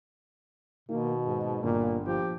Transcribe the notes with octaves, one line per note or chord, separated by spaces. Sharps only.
B2 D#3 A#3 F#4
G#2
G1 A#2 A#3
F3 G4